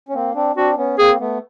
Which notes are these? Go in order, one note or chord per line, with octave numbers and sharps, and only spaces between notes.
C#4
A#3 C4
C4 D4
C4 D4 F#4
B3 C#4
A#3 C4 G#4
A3 B3